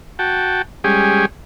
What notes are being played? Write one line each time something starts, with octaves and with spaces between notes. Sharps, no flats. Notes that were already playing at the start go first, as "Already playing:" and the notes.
F#4 G5 A5
G3 G#3 C#4 G4 G#4